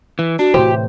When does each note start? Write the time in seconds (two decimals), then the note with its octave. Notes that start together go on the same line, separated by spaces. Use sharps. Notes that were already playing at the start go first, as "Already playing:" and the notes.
0.19 E3
0.39 D4 F#4
0.54 A2 C3 E3 G4 C5